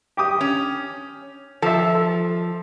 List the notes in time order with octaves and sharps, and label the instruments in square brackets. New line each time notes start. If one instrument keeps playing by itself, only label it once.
[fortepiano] G4 D6 D#6
[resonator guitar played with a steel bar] C#4
[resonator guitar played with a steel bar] F3 [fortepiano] A4 E5
[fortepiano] A4